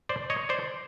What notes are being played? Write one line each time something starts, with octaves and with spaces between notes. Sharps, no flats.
C5 D5
C#5 D#5
C5 D5